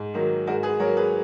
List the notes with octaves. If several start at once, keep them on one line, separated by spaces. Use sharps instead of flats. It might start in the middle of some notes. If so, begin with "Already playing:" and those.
Already playing: G#2
D#3 F#3 A#3
G#2 F#4 A#4
G#4 B4
F#3 A#3 A#4 C#5
G#4 B4